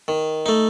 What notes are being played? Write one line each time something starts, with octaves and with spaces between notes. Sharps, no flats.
D#3
A3 D#4